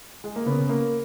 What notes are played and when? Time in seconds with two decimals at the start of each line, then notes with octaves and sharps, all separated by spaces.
0.24 G#3
0.36 A#3
0.46 C#3 B3
0.69 A#3